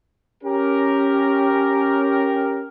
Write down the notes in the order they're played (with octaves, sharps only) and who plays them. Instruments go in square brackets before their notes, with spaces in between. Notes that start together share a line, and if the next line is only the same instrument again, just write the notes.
[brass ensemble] C#4 G4 A#4